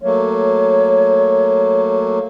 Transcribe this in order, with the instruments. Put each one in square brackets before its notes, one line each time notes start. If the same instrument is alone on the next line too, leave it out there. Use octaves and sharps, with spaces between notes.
[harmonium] F#3 A3 A#3 [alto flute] C#5